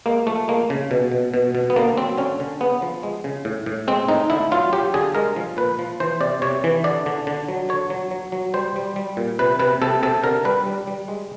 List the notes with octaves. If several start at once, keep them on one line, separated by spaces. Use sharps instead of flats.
G#3 A#3
F3 A3
G#3 A#3
C#3
B2
B2
B2
B2
B3
D3 A#3
F#3 C4
D3 C#4
D3
C#3 B3
F3
G#3
C#3
A2
A2
G#3 C4
A2 D#4
D3 E4
F#3 F4
F#3 G4
D3 G#4
G#3 A#4
F3
A#2 B4
F3
E3 C5
C3 D5
C3 C#5
E3
D3 D5
D3
D3
F#3
D3 C#5
F#3
F#3
F#3
G3 C5
G3
G3
A#2
C3 B4
C3 B4
C3 A4
C3 A4
D3 A#4
G3 B4
G3
G3
G#3